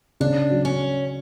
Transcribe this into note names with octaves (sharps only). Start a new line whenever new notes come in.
C#3 D4
F#3
C#4